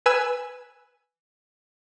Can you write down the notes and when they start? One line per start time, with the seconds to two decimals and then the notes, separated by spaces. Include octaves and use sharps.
0.06 B4 G#5 E6